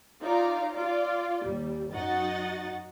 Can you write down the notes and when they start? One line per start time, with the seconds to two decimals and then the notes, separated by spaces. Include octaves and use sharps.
0.22 D#4 F4 D5 F5 A#5
0.73 F4 D5
1.44 D#2 G3
1.92 F#2 D#4 F#4 D#5 F#5 A6